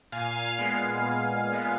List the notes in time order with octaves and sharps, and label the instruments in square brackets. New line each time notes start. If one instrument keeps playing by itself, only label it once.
[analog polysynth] A#2 F5 G#5
G#3 B3
A#2
G#3 B3